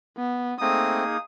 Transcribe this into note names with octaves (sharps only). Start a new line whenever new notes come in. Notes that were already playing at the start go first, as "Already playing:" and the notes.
B3
A3 A#3 C4 D#4 G#4 D#6